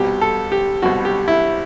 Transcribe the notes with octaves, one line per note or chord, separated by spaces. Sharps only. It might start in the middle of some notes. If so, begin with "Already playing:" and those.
Already playing: C2 B2 G3 G4
A4
G4
C2 B2 G3 F#4
G4
E4